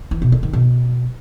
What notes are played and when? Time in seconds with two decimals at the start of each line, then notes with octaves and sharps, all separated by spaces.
0.11 E3
0.22 B2
0.32 A3
0.43 D#3
0.53 B2